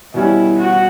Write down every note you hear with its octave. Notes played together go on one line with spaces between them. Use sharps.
B2 G3 C#4 E4
F#4